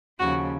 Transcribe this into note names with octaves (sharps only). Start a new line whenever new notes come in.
D#2 C#3 F3 F#4